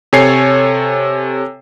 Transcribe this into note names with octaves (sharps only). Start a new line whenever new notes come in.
C3 A4 C#5 G#5 C7